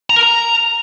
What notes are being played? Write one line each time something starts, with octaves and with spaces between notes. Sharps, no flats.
A#5
A#4
A#5